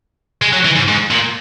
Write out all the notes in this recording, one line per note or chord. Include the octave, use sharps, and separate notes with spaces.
G#3
F#3
E3
G#2
G#2
A#2